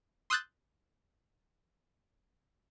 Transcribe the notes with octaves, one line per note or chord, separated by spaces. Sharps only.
C6 D#6 E6 F#6 G6 A6